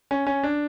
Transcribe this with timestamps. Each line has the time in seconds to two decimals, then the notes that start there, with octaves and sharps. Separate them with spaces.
0.11 C#4
0.27 C#4
0.44 D4